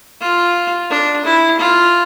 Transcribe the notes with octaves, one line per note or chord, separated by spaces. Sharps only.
F4
D4
E4
F4